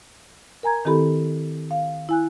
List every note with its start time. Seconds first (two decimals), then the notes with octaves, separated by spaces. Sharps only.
0.63 A#4 G#5 A#5 G#6
0.85 D#3 C4 E4 G4 A4 B5
1.71 F5
2.09 E4 G#5 F#6